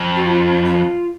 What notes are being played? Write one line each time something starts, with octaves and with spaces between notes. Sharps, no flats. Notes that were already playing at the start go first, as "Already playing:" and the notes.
Already playing: F2
F#4
F4
F4